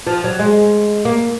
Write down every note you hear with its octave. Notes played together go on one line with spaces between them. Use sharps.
F3
F#3
G#3
A#3